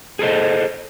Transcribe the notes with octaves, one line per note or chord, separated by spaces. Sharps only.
G#4 A4 C5 D#5